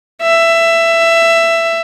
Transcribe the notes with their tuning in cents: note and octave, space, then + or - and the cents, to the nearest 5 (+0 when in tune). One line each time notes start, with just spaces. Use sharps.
E5 +15